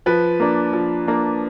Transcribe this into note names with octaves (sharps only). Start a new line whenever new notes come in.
F3 B4
A#3 D4
F3
A#3 D4